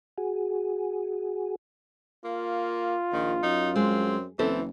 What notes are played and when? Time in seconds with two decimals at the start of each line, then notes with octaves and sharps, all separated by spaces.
0.18 F#4 G#4
2.25 A#3 F4
3.13 A#1 D#3
3.43 F#2 D#4
3.76 G#3 C4
4.39 F#1 E3 C4 A4 C5